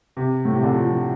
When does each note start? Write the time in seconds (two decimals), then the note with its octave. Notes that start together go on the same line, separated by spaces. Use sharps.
0.17 C3
0.45 A2
0.54 C3
0.63 D3
0.72 F3
0.91 F3